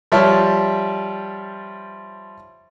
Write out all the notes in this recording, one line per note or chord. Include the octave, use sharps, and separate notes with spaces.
F3 G3 C#5 E5 A5 F6